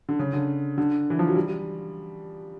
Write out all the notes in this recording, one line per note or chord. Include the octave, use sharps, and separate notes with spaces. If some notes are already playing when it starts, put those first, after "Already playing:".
D3
C#3
D3
D3
E3
F3
F#3
G3